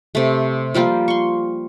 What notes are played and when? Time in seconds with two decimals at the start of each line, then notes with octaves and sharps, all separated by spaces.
0.15 C3 A3
0.74 F3 G3 A#3 F4
1.08 C6 C#6